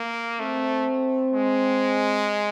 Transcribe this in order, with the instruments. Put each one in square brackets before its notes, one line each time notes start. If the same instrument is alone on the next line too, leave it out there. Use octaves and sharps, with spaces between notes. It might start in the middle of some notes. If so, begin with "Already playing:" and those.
Already playing: [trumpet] A#3
[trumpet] A3 [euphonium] C4
[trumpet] G#3